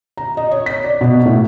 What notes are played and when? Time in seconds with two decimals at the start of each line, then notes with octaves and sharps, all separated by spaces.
0.17 A#5
0.37 D#5
0.51 C#5
0.66 B6
0.84 D5
1.01 B2
1.26 A2